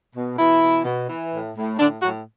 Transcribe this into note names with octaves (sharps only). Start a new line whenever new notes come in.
B2
B2 E3 E4
B2
B2
E3
A2
A2
A2 D3 D4
A2 F#3 F#4